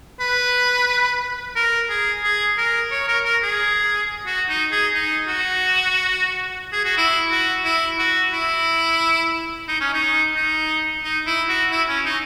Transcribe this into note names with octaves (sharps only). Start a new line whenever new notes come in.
B4
A#4
G#4
G#4
A#4
C#5
A#4
A#4
G#4
F#4
D#4
G#4
D#4
F#4
G#4
F#4
E4
F#4
E4
F#4
E4
D#4
C#4
D#4
D#4
D#4
E4
F#4
E4
C#4
D#4